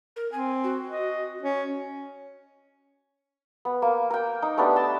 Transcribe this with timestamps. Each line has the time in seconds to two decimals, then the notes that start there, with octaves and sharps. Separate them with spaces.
0.16 A#4
0.32 C4 G#5
0.64 F#4
0.88 D#5
1.43 C#4
3.65 B3
3.82 A#3
4.10 A#4 G5
4.42 D#4
4.57 A3 B3 D4 G4
4.76 G5 A5 E6